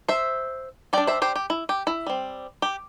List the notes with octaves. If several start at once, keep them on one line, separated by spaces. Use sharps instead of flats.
C5 E5
G3 D4 D5 G5
C5 E5
G4 C5
G4
E4
G4
E4
G3 C4
G4